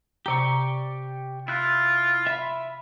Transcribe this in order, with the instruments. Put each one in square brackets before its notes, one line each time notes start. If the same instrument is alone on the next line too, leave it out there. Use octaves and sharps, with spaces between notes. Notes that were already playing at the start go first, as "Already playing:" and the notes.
[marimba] C3 A#5 [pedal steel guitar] G4 D5 C#6
[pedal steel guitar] E4 F#6 [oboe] F4
[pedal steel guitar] E5 B5